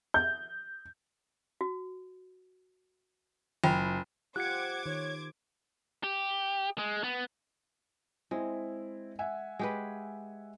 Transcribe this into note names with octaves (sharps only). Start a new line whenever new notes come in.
G6
F#4
F#1 F4 G5 B5
F4 G4 C5 F#5 D6 F#6 G#6 C#7
D#3 C#5
G4
G#3
B3
G#3 C4 E4
E5 F#5 G#5
G#3 G4 B4